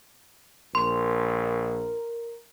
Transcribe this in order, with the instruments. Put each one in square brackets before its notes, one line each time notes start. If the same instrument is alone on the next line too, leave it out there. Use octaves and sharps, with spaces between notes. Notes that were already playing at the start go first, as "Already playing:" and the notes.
[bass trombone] A#1 [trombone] A#4 [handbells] C6